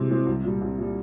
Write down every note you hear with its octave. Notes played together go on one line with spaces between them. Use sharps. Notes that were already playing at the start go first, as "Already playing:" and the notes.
Already playing: C3 E3 G#3 C4
E3 G#3 C4
C2
A#2 G3
C2
A#2 G3